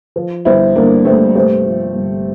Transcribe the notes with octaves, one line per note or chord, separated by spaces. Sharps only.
F3
G1 C4 E4
G1 A#3 D4
G2 A3 C4
C3 A3 C4
F3
G1